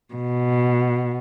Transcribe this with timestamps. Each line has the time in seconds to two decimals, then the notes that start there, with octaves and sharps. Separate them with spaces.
0.14 B2